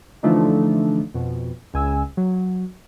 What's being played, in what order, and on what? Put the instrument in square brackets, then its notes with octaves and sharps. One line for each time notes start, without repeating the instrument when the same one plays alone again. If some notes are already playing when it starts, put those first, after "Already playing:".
[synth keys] D3 E3 F3 A3 D4 D#4
F2 B2
C#2 G#5 E6
F#3